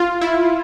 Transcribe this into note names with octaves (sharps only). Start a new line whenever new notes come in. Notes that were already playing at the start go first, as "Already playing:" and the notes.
Already playing: F4
E4